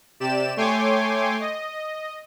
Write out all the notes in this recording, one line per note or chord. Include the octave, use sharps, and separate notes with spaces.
C3 G4 D5 E7
A3 C#5 G5 G#5 C6 D6
D#5